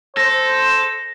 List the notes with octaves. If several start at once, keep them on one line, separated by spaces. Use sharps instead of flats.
A4 C5 A#6